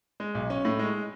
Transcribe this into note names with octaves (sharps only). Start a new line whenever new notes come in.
G#3
B1
C#4
A2
G#3